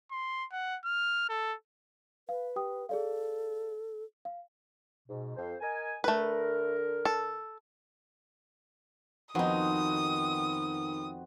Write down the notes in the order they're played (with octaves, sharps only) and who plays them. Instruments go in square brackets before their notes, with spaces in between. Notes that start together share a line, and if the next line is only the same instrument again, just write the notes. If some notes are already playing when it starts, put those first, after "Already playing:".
[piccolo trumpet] C6
F#5
F6
A4
[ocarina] B4 [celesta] F5
[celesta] G4 G5 D#6
[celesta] G#4 D5 F5 [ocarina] A4
[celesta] F5
[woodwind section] G#2 B2
F2 C5
A#4 D#5 G#5
[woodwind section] D3 A#4 [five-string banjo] A3 B4
[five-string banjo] A4
[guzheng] F2 D#4 [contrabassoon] D#3 [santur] B3 C4 F#4 [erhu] D#6